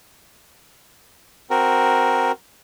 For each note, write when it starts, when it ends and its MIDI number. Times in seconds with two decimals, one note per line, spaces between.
1.50 2.32 60
1.50 2.32 66
1.50 2.32 70